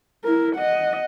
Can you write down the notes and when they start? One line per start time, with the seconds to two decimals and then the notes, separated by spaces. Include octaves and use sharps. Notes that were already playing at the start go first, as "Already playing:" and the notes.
0.24 E4 A#4
0.55 D#5 F#5